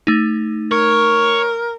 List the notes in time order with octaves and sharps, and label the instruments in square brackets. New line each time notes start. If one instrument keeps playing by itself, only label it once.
[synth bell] A3 D#4
[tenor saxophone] A#4 [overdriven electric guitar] C#5